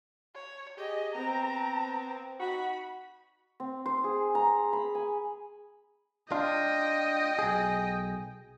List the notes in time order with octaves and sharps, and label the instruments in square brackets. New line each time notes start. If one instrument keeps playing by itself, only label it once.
[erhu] C#5
[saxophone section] G4 G#4 [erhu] D#5
[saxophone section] B3 C4 [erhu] A#5
[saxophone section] D#4 F#4 [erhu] B5
[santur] C4
C5
G#4
A#5
B5
G#5
[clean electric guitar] D4 F4 [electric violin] D#5 G5
[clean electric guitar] B1 G#4